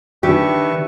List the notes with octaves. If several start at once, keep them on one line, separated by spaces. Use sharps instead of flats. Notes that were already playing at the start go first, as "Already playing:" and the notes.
D#3 D4 G4 B4 E5 C#6